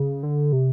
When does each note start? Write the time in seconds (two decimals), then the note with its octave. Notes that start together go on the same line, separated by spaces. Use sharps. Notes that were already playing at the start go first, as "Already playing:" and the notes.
Already playing: C#3
0.23 D3
0.53 C3